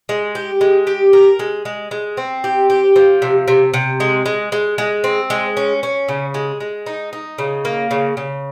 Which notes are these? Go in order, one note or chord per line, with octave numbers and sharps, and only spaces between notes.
G#3
G4
G#3
G4
A#4
G#3
G#3
G#3
C4
G4
G4
F3
C3
C3
C3
G#3
G#3
G#3
G#3
C4
G#3
C#4
C#4
C#3
G#3
G#3
D#4
D#4
C#3
A#3
C#3
C#3